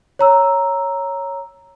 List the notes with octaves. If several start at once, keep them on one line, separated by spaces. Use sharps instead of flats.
C#5 A#5 E6